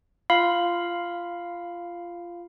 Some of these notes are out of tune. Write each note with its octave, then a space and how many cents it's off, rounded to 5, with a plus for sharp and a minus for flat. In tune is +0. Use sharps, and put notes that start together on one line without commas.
F4 -15 F5 +0 B5 +0